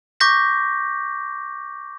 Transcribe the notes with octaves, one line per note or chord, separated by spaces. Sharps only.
C#6 D6 G6 A#6 B6